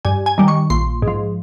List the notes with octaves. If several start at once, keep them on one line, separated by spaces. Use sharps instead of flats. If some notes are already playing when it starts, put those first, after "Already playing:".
G2 G#5
G#5
D#3 G3
C#6
A#1 C6
G#2
F3